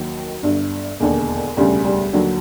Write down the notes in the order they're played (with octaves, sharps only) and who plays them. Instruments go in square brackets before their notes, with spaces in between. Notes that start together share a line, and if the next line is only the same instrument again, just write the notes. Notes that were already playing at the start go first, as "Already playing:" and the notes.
Already playing: [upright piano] D#2 D#3 F#3
G1 G2 D3
E1 D#2 D3
E1 D2 C#3 G3
G3
D#2 D3 F#3